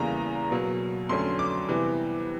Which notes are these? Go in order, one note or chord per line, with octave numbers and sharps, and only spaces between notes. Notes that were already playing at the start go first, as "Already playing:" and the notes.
Already playing: E2 C#3 E3 G3 A#3 A#5
B2 F#3 A#3
F2 D3 F#3 A3 C#4 C6
D6
C3 E3 G3 B3